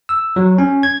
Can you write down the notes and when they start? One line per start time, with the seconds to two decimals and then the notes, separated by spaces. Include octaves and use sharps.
0.09 E6
0.36 F#3
0.58 C#4
0.83 G#6